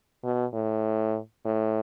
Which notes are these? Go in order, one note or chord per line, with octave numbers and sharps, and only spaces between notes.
B2
A2
A2